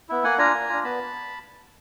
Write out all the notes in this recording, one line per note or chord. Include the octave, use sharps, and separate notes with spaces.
B3 E4
A#3 F#5 G#5
D4 F4 G#5 A#5
A#3
D4 F4
B3 A5 B5